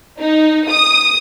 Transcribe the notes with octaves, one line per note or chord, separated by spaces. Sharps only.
D#4
D#6